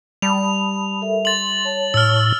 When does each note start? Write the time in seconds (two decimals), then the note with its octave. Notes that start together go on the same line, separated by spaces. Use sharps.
0.22 G3 A5 B5 D#6 F7
1.02 A4 A#4 E5
1.25 C6 A6 F#7
1.65 C#5 A5
1.94 A2 E6 F6